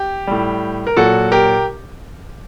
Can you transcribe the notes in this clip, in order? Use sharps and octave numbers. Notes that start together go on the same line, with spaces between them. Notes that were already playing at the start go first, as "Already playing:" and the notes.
Already playing: G4
A2 G3
A#4
A#2 F#3 F#4 A4
G4 A#4